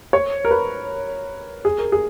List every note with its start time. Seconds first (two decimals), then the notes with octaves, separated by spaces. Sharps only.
0.13 C#5
0.45 A#4
0.51 B4
1.65 G#4
1.78 A#4
1.92 G#4